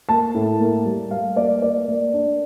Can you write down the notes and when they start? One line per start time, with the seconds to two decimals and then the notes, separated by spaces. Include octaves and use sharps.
0.09 A#3 A5
0.35 A2
0.60 A#3
0.85 G3
1.11 G3 F5
1.36 A#3 D5
1.62 A#3 D5
1.88 A#3
2.13 D4